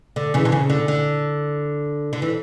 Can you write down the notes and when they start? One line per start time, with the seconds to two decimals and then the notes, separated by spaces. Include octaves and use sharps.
0.16 D3
0.34 C#3 E3
0.45 D3
0.52 C#3
0.70 D3
0.88 D3
2.13 D3
2.22 E3